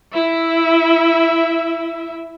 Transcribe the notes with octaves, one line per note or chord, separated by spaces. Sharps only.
E4 E5